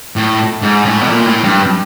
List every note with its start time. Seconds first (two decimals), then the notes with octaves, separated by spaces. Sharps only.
0.16 A2
0.62 G#2
0.85 A2
1.01 B2
1.09 A#2
1.26 A2
1.44 G2